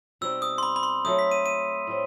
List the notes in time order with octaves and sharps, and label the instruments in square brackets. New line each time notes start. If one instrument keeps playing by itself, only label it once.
[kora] B2 G3 C4 D#4 [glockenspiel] E6
[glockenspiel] D#6
C6
B5
B5
C6
[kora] F#3 A3 D#4 [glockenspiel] D#6
[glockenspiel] B6
D#7
D#7
[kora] A2 G3 C4